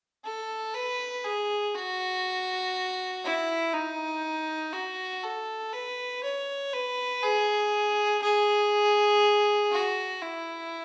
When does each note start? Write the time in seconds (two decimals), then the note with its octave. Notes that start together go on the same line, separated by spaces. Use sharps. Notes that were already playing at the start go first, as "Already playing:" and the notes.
0.25 A4
0.75 B4
1.25 G#4
1.75 F#4
3.25 E4
3.74 D#4
4.73 F#4
5.23 A4
5.73 B4
6.23 C#5
6.73 B4
7.23 G#4
8.22 G#4
9.72 F#4
10.22 E4